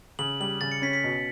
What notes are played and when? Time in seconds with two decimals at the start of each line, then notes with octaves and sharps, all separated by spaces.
0.19 C#3 F#7
0.40 G3 F#7
0.61 C#3 A6
0.72 C#7
0.82 C#4 B6
0.93 B6
1.04 B2